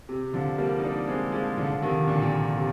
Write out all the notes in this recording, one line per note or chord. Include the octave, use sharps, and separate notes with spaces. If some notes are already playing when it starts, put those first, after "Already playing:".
C3
D3 F3
G3 A#3
D#4
A#3 D4
G#3 C4
F3 G#3
D3 F3
D3
C3 D#3
A#2 D3
A#2
C3
C3